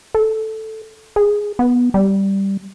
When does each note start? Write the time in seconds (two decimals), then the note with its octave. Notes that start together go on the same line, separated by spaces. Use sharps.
0.14 A4
1.16 G#4
1.59 B3
1.94 G3